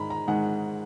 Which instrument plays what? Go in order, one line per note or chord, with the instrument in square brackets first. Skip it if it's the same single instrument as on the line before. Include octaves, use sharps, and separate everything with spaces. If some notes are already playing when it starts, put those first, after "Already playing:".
Already playing: [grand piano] G#2 D#3 G#3 A#5 B5
A#5
G#2 D#3 G#3 F#5